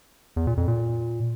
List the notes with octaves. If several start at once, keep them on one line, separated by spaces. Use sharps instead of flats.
E2
A#2
F2
A#2